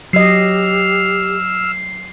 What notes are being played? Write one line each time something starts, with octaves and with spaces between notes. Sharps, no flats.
F#3 G4 D#5 E6 F6 C7